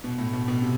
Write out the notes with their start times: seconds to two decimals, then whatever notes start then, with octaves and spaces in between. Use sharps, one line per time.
0.04 B2
0.18 A2
0.33 B2
0.48 B2
0.62 C3